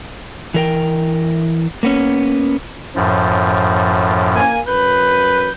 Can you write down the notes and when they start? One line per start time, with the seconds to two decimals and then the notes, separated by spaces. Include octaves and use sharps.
0.54 E3 A#4 G5
1.83 A#3 B3 C#4
2.95 F#2 A2 F3
4.35 A#3 G#5
4.67 F#2 B4 G6